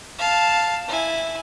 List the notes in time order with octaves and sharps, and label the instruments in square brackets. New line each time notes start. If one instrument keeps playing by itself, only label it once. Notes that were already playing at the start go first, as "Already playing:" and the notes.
[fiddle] F5 A5
E4 G#5